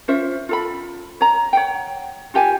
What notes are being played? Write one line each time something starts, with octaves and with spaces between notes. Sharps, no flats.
C#4 F4 C5 E5
F4 A4 B5
C#5 A#5
C#5 F#5 G5
F4 G4 G5 G#5